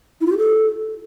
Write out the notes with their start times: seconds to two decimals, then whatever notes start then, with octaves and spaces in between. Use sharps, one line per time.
0.21 E4
0.26 F4
0.32 G4
0.38 A4